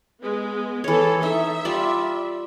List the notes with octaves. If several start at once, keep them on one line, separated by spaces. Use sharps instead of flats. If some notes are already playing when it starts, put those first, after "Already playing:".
G#3 B3
E3 G#4 A4 C#5
D#4 E5
G3 F4 D5